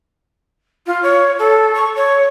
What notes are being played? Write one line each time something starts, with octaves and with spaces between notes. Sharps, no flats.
F4
C#5
A4
C#6
C#5